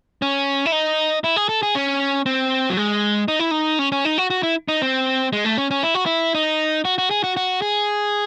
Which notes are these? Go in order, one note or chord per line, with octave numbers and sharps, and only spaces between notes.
C#4
E4
D#4
E4
G#4
A4
G#4
C#4
C4
F#3
G#3
D#4
E4
D#4
C#4
C#4
D#4
F#4
F#4
E4
D#4
C4
G#3
A3
C#4
C#4
E4
F#4
E4
D#4
F#4
F#4
G#4
F#4
F#4
G#4